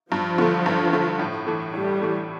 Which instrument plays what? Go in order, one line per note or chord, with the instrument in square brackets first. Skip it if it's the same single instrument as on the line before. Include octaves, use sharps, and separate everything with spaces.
[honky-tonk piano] G2 [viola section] F3
[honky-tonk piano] D3 A3
G2
D3 A3
A2
E3 A3
[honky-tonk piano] A2 [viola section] G3
[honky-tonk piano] E3 A3